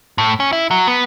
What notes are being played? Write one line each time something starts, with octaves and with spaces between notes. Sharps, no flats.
A2
C#4
E4
F#3
B3